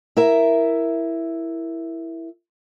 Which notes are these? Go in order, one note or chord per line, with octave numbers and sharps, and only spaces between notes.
E4 A#4 E5